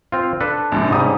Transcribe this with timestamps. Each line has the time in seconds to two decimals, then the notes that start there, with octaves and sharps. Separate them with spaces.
0.12 C4 F4
0.40 D4 A4 B4
0.72 A#1 G#2 C3
0.90 G#2 C3 G3 D#6
1.04 C#4